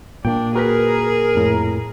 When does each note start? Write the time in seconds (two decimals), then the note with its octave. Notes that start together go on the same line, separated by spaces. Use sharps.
0.25 A#2 A#3 D4 G5
0.55 F#4 G#4 A#4 B4 B6
1.35 F2 A2